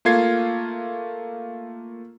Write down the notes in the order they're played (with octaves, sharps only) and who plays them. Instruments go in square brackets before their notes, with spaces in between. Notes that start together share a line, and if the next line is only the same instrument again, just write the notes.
[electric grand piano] A3 A#3 F4 G#6 C7